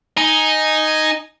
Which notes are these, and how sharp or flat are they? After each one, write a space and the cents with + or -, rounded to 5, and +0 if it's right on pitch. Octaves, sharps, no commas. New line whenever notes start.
D#4 +0 G#5 +0